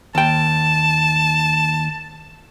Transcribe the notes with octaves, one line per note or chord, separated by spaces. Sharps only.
D#2 G5 A5